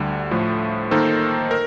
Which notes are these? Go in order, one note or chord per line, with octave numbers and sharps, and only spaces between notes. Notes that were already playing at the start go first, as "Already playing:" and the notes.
Already playing: D2 D3 G3
A2 F3 A3
D#3 A#3 D#4 A4 C5
A#4